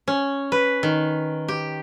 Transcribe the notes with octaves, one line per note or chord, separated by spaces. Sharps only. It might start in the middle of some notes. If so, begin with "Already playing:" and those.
C#4
B4
D#3
G4